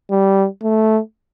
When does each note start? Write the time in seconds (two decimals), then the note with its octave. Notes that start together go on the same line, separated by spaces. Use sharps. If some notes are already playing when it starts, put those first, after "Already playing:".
0.11 G3
0.63 A3